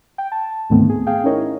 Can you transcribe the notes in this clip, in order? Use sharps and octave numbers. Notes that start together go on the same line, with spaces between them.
G5
A5
D2 G#2 D#3 A3 B3 C4
G#4
G#4 F5 G5
C#4 D#4 E4 A#4 C#5 D#5